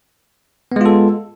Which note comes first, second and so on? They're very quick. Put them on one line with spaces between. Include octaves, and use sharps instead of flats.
B3 G#3 F4 A4